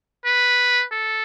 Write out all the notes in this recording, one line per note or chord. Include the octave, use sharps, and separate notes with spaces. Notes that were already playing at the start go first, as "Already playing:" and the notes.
B4
A4